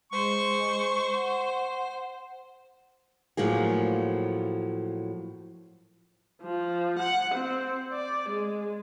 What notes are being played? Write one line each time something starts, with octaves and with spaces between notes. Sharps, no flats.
G#3 C5 C#6
F#5
A2 F3 F#3 A#3 G#4
F3
F#5
C4
D5
G#3